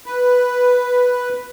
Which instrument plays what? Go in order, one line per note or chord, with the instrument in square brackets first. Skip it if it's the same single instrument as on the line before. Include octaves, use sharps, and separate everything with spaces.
[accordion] B4